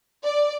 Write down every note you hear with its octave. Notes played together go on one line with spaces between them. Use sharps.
D5